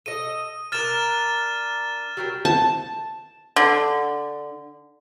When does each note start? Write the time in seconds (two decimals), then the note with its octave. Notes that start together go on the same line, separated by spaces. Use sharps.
0.06 A4 D#5 D#7
0.72 D4 A#4 F6 A6 E7
2.17 F#3 G3 A#4
2.45 A5
3.56 D3